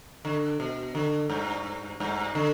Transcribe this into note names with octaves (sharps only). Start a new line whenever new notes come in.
D3
B2
D3
G2
G2
D3